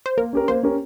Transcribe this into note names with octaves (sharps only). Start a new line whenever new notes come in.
C5
A#3 A#4
C#4 G4 A#4
A#3 C5
C#4 G4 A#4